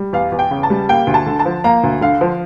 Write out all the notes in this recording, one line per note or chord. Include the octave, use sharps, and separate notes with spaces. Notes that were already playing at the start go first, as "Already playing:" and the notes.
Already playing: G3
E2 F5
E2
G5
C#3
A5
G3
A#3 G5
D2
A5
D3
A5
F3
A#3 A#5
D2
D3 F5
F3